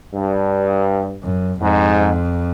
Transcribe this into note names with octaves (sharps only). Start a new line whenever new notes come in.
G2
F#2
F2 G#2